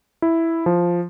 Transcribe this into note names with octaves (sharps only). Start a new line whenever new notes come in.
E4
F3